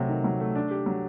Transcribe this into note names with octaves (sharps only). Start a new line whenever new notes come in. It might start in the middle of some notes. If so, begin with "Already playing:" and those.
Already playing: C3 F#3 A3
D#3
F#3
A3
D4
G4
F#3